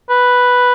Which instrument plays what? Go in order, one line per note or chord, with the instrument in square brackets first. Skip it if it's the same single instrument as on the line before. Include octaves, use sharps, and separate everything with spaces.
[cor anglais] B4